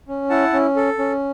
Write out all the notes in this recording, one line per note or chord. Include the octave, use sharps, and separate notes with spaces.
C#4
E4 F#5 A5
C#4
A4
C#4